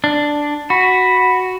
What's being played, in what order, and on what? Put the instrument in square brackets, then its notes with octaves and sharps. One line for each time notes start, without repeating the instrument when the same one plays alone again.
[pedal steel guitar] D4
[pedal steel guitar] F#4 [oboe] B5